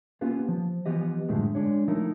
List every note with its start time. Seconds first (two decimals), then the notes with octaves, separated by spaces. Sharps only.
0.21 A#3 B3 C#4 F4 G4 B4
0.48 F3
0.86 E3 F3 B3 G4 D#5
1.29 F#2 A2 D3 F3 G#3
1.55 G#3 D4 C#5
1.88 F3 A3 D#4 E4 A#4